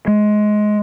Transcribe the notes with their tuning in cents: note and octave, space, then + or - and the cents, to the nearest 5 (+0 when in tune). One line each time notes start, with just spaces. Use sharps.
G#3 +20